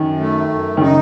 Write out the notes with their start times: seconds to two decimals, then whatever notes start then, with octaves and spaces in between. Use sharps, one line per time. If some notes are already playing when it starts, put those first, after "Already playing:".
Already playing: F#2 D#3
0.19 A3
0.50 F#2
0.77 D#3
0.81 C#3 D#4